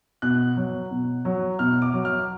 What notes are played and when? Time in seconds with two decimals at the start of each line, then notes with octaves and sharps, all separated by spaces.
0.22 B2 F#6
0.57 F#3
0.91 B2
1.25 F#3
1.59 B2 F6
1.82 D6
1.93 F#3
2.05 F6